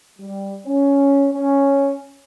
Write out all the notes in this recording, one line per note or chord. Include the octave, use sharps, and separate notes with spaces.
G3
C#4
C#4